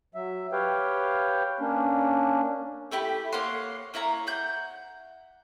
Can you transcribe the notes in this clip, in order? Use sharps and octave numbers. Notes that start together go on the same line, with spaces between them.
F#3 E5
G4 B4 C#5 F5 G5
A#3 C#4 D4
A3 E4 G4 B5
A#3 C#5 F#5 C6
A#3 E4 C#5 A#5
F#5 G6